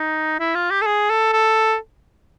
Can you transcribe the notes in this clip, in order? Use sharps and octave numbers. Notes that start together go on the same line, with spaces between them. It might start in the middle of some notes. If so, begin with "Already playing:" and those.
Already playing: D#4
E4
F4
G4
A4
G#4
A4
A4